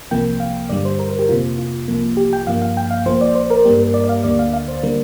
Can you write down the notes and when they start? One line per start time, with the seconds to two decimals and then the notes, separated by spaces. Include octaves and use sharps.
0.11 C2 C3 F3 A#3 G5
0.40 F5
0.69 G2 D3 G3 D5
0.85 C5
0.99 A#4
1.10 A#4
1.19 G4
1.29 F2 C3 A#3 F4
1.58 F4
1.88 C2 C3 F3 A#3
2.17 G4
2.33 G5
2.47 G2 F3 A#3 F5
2.62 F5
2.77 G5
2.91 F5
3.06 A#1 A#2 F3 A#3 C5
3.21 D5
3.35 C5
3.50 A#4
3.65 G2 G3 A#3 G4
3.79 A#4
3.94 D5
4.04 D5
4.09 F5
4.24 D2 D3 A#3 D5
4.39 F5
4.53 F5
4.68 C5
4.83 D3 G3 A#3 A#4